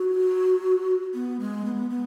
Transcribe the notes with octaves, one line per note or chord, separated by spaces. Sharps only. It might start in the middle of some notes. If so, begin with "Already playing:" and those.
Already playing: F#4
B3
G#3
B3
B3